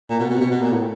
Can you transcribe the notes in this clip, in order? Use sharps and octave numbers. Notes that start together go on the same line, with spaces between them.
A#2
B2
B2
C3
B2
B2
A#2
A2